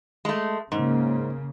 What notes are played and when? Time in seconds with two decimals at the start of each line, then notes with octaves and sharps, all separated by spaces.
0.25 G#3 A3
0.72 G#2 C#3 A#3